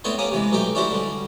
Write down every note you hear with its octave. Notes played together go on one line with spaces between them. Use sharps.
A2 B3 C4 D4 C#5 C6
A#3 C#4 G4 D#6
C3 E3 G#3
B1 A3 D#4 G4 G5
C#4 D4 E4 F#4 G4 C5
D3 G3